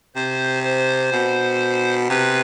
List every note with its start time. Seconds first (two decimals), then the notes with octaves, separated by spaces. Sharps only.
0.16 C3 C5
0.64 C5
1.12 B2
2.10 C3 B4